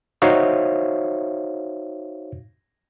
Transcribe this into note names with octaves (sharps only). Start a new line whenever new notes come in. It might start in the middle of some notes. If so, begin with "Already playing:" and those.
D#4 F#4 C5 C#5 E5 F5